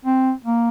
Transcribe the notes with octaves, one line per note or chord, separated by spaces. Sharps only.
C4
A#3